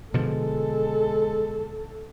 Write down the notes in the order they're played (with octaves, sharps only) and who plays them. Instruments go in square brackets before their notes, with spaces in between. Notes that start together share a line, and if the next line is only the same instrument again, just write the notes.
[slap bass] B2 D3 F3 [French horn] G#3 [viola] A4